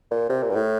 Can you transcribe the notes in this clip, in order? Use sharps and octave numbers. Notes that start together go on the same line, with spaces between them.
A#2
C3
A#2
G2
A2